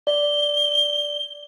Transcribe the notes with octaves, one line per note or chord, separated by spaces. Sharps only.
D5 G7